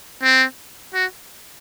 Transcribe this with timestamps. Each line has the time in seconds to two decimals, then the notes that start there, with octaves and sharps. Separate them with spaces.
0.23 C4
0.94 F#4